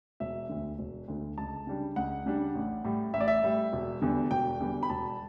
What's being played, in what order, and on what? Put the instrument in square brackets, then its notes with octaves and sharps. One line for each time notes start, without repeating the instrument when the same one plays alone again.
[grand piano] E1 E5
D2 D3
E1
D2 D3
C#2 A5
C#3 G3 D4
C#2 F#5
C#3 G3 D4
A1
A2 G3
A1 E5
D5
E5
A2 G3
E1
E2 D3 G3
E1 G5
E2 D3 G3
B5
E1 A5